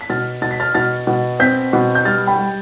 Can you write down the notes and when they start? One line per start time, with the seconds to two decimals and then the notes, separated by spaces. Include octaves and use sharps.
0.01 B6
0.10 B2 F6 A6
0.42 B2 A6
0.51 B6
0.60 F6 A6
0.74 B2 F6 A6
1.07 B2
1.40 C4 G6 B6
1.73 B2
1.95 G6
2.05 G3 F6 A6
2.27 G5 B5
2.38 G3